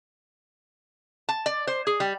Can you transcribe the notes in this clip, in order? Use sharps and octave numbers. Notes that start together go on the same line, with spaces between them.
A5
D5
C5
G#4
G3